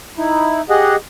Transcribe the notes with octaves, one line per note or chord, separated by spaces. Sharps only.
D#4 E4
G4 G#4 D#5 F#5